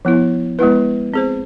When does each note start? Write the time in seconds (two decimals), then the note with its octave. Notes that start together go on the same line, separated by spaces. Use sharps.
0.05 F3 B3 E4
0.59 G#3 B3 E4 B4
1.14 C4 G#4 C5